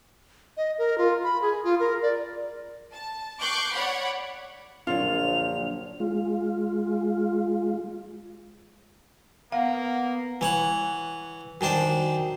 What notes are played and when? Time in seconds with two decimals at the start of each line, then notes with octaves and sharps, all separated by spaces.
0.57 D#5
0.78 A#4
0.98 F4
1.24 B5
1.42 G#4
1.64 F4
1.80 A#4
2.02 D5
2.91 A5
3.40 C#6 D6 F#6 G6 C7
3.73 C#5 D5 F#5 B5
4.87 A#1 F#2 D3 F#3 F4 F7
6.00 G#3 F4
9.52 A#3 B3 F5 F#5
10.41 E3 C#5 F#5
11.61 F#2 D#3 D4 C5